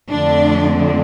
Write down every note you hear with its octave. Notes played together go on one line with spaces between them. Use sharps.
F2 D3 A3 D4